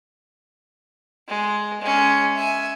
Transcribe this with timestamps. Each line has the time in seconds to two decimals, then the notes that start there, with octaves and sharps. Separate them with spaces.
1.28 G#3
1.81 G#3 C#4
2.36 E5 G#5